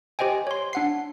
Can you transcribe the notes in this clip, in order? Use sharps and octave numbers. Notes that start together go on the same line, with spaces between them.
G4 C5 D#5 G5 G#5
C#5 C6
D4 F#5 C7